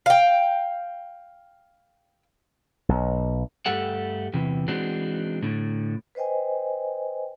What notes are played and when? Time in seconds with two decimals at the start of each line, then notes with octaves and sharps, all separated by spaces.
0.06 F5 G5
2.89 B1
3.66 G2 A3 G4 A4 F#5
4.33 E2 C3 E3
4.68 E3 G#3 C4 D4 D#4 F#4
5.43 A2 D3
6.15 B4 C5 D#5 G5 G#5